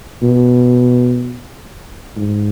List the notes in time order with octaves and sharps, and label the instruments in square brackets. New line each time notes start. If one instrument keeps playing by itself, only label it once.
[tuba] B2
G#2